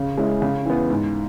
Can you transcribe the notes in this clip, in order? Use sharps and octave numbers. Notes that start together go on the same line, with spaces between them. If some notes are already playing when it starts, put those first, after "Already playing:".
Already playing: C#3
G#3 C#4 E4
C#3
E3 B3
G#2